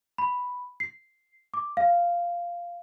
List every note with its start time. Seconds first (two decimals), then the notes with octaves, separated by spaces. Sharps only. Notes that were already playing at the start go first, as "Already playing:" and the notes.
0.18 B5
0.80 C7
1.54 D6
1.77 F5